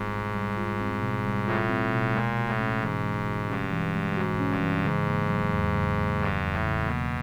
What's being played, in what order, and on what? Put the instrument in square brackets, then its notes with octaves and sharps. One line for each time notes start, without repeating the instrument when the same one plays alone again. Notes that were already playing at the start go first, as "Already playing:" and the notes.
Already playing: [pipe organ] G#2 [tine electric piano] G3 C4 F4
[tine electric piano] B2
G3
F4
C4
B2
G3
[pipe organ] A2 [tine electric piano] F4
[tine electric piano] C4
B2
[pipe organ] A#2 [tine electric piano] G#3
[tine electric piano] F#4
[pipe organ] A2
[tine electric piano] C#4
[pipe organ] G#2 [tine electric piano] E3
[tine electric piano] G#3
F#4
[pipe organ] G2 [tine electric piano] C#4
[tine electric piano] E3
G#3
[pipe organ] G#2 [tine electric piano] F#4
[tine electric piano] C#4
[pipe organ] G2
[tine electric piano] E3
[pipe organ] G#2 [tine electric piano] C#3
[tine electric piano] A#3
F#3
E2
C#3
A#3
[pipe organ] G2 [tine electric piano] F#3
[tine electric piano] E2
[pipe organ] A2
[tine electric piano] C#3
[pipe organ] B2 [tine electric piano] A#3